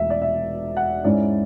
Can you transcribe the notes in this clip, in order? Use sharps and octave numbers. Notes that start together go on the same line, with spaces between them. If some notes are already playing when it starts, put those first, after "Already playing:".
Already playing: E1 E2 B2 A3 E5
D5
E5
F#5
G#2 G#3 C#4 E4 D5